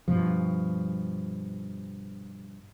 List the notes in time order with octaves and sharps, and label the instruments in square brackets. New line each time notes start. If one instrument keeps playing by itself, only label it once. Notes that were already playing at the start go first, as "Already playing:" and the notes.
[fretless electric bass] G2 B2 F3